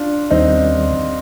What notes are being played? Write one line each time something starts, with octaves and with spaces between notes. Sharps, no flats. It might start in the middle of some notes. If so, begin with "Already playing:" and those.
Already playing: D4 F4
D#2 D#3 G3 C4 D#4